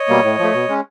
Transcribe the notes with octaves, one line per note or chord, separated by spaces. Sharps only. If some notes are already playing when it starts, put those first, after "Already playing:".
Already playing: C#5 D#5
B2 G3 A#3
A2
F3 A3
B2
G#3 C#4